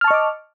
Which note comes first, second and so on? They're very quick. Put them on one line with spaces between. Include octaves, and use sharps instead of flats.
F6 A5 C#6 D#5 D6